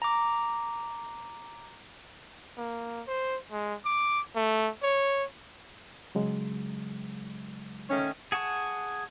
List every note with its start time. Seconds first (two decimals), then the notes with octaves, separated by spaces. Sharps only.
0.02 A#5 D6
2.57 A#3
3.07 C5
3.52 G#3
3.85 D6
4.36 A3
4.83 C#5
6.15 C#3 F#3 G#3
7.90 D#3 A3 C#4
8.32 G#4 F#5 A5 C#6